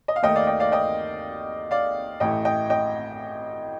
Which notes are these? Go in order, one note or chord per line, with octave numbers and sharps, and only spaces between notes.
D#5
F5
D#2 D#3 A3 D#4 D#5 G5
D5 F5
D#5 G5
D5 F5
D#5 G5
D5 F5
A1 A2 A3 D#5 G5
D#5 G5
D#5 G5